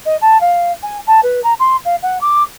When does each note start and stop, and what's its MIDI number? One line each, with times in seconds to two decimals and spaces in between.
0.06 0.17 75
0.21 0.40 81
0.41 0.72 77
0.83 0.98 80
1.07 1.20 81
1.23 1.42 71
1.44 1.53 82
1.59 1.76 84
1.85 1.96 77
2.02 2.20 78
2.21 2.43 86